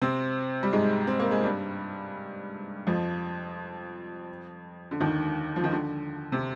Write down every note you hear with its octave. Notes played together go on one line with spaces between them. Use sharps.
C3 C4
G3
G#2 G#3
C4
A#3
G#3
G2 G3
F2 F3
D3
D#2 D#3
F3
D#3
D3
C3